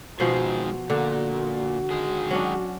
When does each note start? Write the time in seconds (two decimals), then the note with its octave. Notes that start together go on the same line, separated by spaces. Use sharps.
0.20 G#2 B2 D#3 F3 F#4 G#4 C5
0.90 A#2 D3
1.91 D#3 G#3 G#4
2.31 F#3 C#4 D4